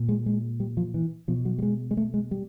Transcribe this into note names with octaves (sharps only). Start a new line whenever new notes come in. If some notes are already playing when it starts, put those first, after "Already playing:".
Already playing: A#2
G#3
G#3
G3
F3
E3
B2 F3
F#3
G3
G#3
G#3
A3
G#3
G3